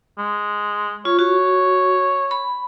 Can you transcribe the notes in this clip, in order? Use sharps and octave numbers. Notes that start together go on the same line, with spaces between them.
G#3
F4 C#5
F#4 C#5
B5